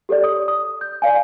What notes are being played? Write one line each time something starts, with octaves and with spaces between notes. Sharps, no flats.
G4 A4 C#5 D5
D#6
D#6
G6
D5 F5 G#5